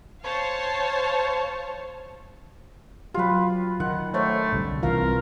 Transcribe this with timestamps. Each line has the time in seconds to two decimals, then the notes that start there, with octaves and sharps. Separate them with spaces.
0.22 C5 C#5 F5 A5
3.14 F#3 F4 G4 B4
3.80 D#3 F#5
4.14 A3 C5 C#5
4.53 C2 D3 G3
4.83 C2 C3 E3 F4 A#4 F5